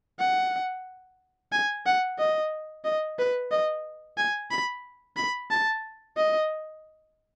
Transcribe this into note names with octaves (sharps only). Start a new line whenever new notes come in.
F#5
G#5
F#5
D#5
D#5
B4
D#5
G#5
B5
B5
A5
D#5